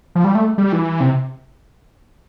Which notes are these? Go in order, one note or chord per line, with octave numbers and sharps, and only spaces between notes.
F3
G3
A3
G3
E3
C3